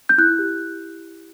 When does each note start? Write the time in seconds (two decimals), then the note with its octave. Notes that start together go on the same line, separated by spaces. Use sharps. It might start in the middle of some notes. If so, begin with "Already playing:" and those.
0.09 G6
0.18 E4 F#6
0.39 G4